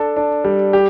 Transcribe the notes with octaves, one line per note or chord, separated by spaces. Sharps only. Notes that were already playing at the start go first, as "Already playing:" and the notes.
Already playing: D4 A4
D4
G3
G4